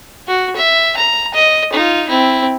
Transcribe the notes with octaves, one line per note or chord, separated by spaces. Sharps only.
F#4
E5
A#5
D#5
D#4 F4
C4 E4